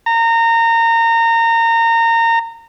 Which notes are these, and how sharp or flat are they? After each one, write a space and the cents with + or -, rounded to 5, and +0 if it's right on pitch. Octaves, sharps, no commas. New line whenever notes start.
A#5 -25